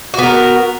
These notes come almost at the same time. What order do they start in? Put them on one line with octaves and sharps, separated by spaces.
F#4 B3 A#4